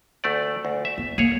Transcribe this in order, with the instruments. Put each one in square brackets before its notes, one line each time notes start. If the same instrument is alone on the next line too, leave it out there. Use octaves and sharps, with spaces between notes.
[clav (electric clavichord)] D2 A3 D5
D2
E5
[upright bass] B3
[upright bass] A#3 [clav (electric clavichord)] G#4 C#5